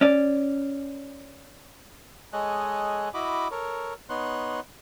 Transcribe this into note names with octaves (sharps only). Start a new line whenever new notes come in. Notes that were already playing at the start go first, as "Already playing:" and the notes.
C#4 D5
G#3 G#4 A4 C#5 D#5 F#6
E4 F#4 D#5 B5 D6
A4 A#4 C#5
B3 D#4 C#5 C6 F#6